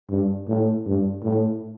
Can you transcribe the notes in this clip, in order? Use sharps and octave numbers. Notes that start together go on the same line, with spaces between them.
G2
A2
G2
A2